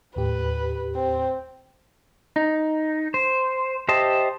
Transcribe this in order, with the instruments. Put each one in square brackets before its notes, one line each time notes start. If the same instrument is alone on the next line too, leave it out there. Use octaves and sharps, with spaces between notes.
[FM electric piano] D#2 A2 G4 [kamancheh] B4
[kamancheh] C4
[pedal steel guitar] D#4
C5
G4 C5 D#5 E5 A5